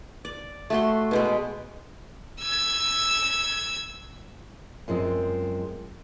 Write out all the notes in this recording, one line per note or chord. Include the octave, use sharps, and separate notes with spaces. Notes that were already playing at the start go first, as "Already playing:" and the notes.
D5
A3 F#4 C6
B2 G#3 G5
E6 G#6
F#2 F3 G#3 C4